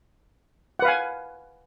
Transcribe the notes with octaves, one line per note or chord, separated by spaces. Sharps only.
B4 F5 F#5 G#5